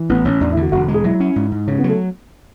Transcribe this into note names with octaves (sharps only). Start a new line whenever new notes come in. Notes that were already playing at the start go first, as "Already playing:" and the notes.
Already playing: E3
A1 B3
A1 C#4
E2 D4
E4
D3
F#4
E1 F#4
G#3
G#4
F#3 E4
C#4
G#2
G#2
C#3 C#4
B3
F#3 A3